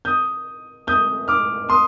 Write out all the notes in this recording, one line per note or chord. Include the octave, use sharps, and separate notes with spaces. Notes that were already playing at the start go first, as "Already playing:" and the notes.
D#6 G6
D#6 G6
D6 F6
C6 D#6